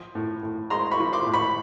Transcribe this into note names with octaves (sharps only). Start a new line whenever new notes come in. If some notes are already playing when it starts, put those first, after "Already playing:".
Already playing: F3
A2
A2
G#3 A#5 C6
B5 C#6
F3
C6 D6
A2
B5 C#6